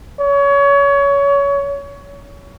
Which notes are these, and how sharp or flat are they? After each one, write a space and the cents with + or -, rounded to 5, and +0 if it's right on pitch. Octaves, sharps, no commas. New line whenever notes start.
C#5 +25